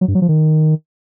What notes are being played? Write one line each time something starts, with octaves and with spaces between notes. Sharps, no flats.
F#3
G2
F#3
F3
D#3